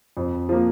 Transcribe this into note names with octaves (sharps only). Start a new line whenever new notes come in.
F2
F3 A#3